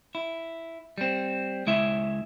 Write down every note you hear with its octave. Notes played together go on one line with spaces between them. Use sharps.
E4
G3 C4
C#2 G#3 E4 E5